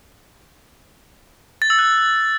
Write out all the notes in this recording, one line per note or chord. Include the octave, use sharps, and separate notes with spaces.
A6
E6
F#6